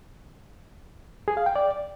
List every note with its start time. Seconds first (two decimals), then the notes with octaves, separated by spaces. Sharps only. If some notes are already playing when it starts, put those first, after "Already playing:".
1.28 G#4
1.37 F5
1.46 G5
1.56 D5